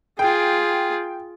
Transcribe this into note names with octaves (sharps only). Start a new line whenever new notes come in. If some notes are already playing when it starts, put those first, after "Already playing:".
F4 G#4 G5